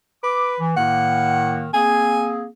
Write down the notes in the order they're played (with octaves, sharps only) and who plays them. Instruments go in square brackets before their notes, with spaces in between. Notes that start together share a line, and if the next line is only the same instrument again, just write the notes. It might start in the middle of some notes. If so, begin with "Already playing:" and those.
[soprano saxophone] B4 [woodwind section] D6
[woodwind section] E3
[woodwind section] A2 D#3 A#3 [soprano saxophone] F#5
[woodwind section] A#3 C4 G#4 [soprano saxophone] G#5